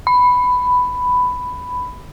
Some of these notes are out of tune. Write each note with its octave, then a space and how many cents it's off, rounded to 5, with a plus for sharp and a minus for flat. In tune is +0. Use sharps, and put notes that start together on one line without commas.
B5 +10